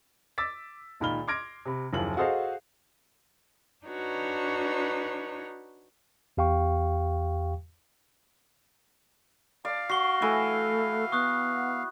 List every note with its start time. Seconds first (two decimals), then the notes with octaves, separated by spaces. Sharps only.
0.38 D6 E6 A6 B6
1.00 C#2 A#2 D#3 B5 F6 G7
1.28 C6 D6 F6 G#6 A#6 D7
1.65 C3 B5
1.93 F#1 D#2 F3 E4 F#7
2.17 F#4 G#4 A4 C5 D#5 F5
3.85 D4 D#4 F#4 B4 C#5
6.37 E2 G4 F5 G5 C#6
9.65 D5 F5
9.89 F#4 C#6 C7 G7
10.22 E3 A3
11.12 B3 C#6 D#6 F#6